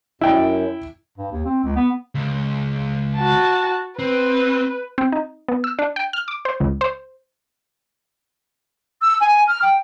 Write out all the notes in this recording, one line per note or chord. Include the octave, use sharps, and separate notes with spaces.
F#2 E4 G5
G2
D#2
C4
C#2
B3
C#2
F#4 A5
C4 B4
C4
D#4
B3
E6
D4
G5
F6
D6
C5
C#2
C5
E6
G#5
F6
G5